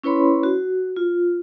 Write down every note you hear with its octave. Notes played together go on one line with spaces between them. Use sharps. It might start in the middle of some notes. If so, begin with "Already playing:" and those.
C#4 E4 B4 C#5 B5 C6
F#4
F4